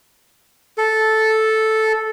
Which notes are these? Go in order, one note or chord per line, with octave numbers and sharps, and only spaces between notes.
A4